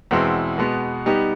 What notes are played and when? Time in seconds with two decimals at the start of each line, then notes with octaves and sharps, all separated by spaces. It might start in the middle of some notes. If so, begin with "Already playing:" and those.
0.11 E2 B2 G#3 C4 E4
0.58 B2 G#3 B3
1.06 G3 B3 D#4 G4